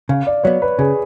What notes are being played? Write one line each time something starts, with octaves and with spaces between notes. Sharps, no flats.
C#3 F5
D5
F#3 B3 C#5
B4
C#3 G#4